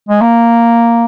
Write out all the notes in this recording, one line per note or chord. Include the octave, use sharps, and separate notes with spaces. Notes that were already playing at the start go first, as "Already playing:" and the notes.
G#3
A#3